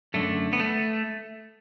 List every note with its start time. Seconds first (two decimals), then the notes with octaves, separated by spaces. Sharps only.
0.14 F#2 D3 A3
0.53 B3
0.60 A3